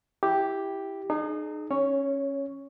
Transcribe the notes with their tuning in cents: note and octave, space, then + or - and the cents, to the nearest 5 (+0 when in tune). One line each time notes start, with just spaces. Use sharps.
E4 +0 G4 +0
D#4 -35 G#4 +25
C#4 -15 C#5 +5